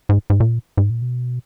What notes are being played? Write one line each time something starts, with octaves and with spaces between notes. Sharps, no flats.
G#2
G#2
A#2
G#2
A#2
B2